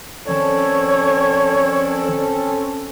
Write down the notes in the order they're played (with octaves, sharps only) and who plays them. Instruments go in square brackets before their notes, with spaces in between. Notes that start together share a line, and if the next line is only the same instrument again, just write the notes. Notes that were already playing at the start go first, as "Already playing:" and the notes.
[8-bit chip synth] D#3 F3 D5 [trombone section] C4 C#4 A4 [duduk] C#5